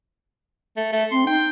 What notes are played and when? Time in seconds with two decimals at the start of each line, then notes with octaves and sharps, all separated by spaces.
0.77 A3
0.92 A3
1.11 C4 C6
1.27 D#4 G5